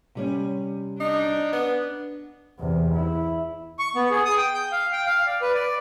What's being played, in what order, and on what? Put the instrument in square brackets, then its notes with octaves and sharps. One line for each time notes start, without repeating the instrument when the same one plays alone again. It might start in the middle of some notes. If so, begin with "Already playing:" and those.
[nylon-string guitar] C3 G3 C#4
[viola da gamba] D4 [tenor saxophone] D#4
[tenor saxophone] B3
[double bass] E2 C3
E4
[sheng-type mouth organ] C#6
B3
G#4
D#6
G5
G6
F5
G5
F5
D5
B4
D5